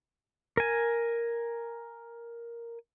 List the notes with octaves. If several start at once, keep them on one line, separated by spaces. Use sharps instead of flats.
A#4 G#5